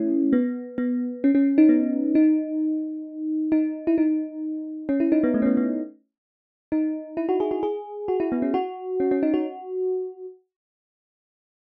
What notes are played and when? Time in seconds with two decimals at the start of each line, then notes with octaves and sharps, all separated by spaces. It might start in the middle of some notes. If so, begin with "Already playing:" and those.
Already playing: A3 C#4 E4
0.33 B3
0.78 B3
1.24 C#4
1.35 C#4
1.58 D#4
1.69 B3
2.15 D#4
3.52 D#4
3.87 E4
3.98 D#4
4.89 C#4
5.00 E4
5.12 D#4
5.24 B3
5.34 A3
5.42 C#4
5.46 B3
5.57 B3
6.72 D#4
7.17 E4
7.29 F#4
7.40 G#4
7.51 F#4
7.63 G#4
8.08 F#4
8.20 E4
8.32 B3
8.42 C#4
8.54 F#4
9.00 C#4
9.11 C#4
9.23 D#4
9.34 F#4